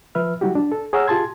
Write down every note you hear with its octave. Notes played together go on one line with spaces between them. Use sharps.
F3 B4 E5 F6
F#3 G3 E4 F#4 G4
D4
A4
G#4 C#5 F#5 A#5 E6 F6
F4 G4 G#4 A5 C6 G#6